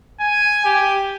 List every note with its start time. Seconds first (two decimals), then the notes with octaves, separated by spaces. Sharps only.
0.20 G#5
0.65 G4